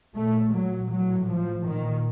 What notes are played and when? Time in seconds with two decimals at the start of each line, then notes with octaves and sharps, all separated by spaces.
0.17 A#2 A3
0.55 F#3
0.91 A2 F#3
1.29 F3
1.66 A#2 D#3